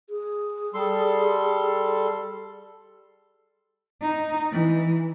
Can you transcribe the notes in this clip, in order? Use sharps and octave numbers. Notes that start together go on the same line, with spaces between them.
G#4
G3 A4 C6
D#4
E3